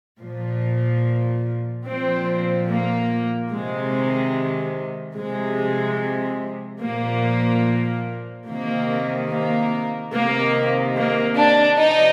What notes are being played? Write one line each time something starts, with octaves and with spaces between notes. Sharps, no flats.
A#2 F3
A#2 F3 C4
A#3
C3 D#3 G#3
C3 F3 G#3
A#2 F3 A#3
C3 D#3 A#3
A#3
C3 D#3 A#3
A#3
D4
C3 F3 D#4